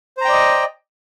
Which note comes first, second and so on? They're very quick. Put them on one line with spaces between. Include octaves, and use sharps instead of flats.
C5 A#5 G5 D5 D#5